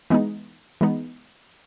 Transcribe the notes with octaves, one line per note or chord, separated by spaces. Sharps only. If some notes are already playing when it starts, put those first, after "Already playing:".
E3 G#3 B3 D#4
E3 G#3 B3 D#4